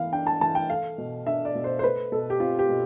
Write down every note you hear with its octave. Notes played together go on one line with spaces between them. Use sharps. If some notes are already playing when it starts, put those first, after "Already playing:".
Already playing: E3 B3 F5
D4 G5
A5
E3 A5
G5
A3 F5
B2
D4 E5
D5
B2
C5
C5
A3 B4
B2 A4
G4
C4 F4
G4
B2